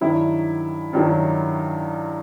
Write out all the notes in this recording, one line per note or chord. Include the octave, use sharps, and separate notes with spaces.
G2 D#3 F#3 E4
G2 D#3 F#3